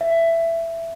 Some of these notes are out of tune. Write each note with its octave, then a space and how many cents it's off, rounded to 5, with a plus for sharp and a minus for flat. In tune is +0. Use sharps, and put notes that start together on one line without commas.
E5 +15